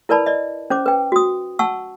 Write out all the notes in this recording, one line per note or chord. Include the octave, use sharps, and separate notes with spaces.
E4 A#4 B4 D5 A5 B5
D5 D#5
C#4 C5 D6
B4 G5
F#4 D#6
F#5 A5 C#6 E6